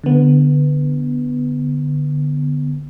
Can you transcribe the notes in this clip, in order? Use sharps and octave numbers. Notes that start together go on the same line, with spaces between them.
D3 B3